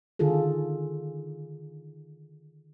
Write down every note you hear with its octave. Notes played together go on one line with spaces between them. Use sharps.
D3 D#3 F4 G#4 A4